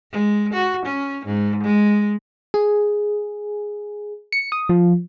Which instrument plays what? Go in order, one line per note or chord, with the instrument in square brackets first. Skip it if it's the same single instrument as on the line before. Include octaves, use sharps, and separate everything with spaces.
[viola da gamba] G#3
F#4
C#4
G#2
G#3
[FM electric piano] G#4
C#7
D#6
F3